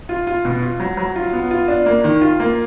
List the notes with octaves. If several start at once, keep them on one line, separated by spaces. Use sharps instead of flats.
F4
F4
B2
F4
F#3
F#3
F4
B3
F4
D4
A#3
D#3
F4
A#3